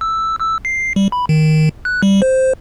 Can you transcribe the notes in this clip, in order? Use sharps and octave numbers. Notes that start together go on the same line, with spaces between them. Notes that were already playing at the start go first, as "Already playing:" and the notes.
E6
E6
C7
G3
B5
D#3
F#6
G3
C5